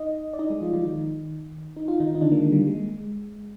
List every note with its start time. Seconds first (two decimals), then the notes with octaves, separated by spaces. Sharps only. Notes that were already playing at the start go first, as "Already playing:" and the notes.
Already playing: D#4 D#5
0.33 D5
0.39 D#4 D#5
0.50 G#3 G#4
0.61 F3 F4
0.73 F3 F4
0.84 D#3 D#4
1.77 D#4
1.88 F4
2.00 D#3 D#4
2.15 D#4
2.21 D3 D4
2.32 A#3
2.37 G#3
2.52 G3
2.67 G#3